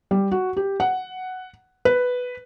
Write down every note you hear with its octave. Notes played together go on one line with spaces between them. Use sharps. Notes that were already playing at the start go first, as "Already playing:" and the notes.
G3
F#4
G4
F#5
B4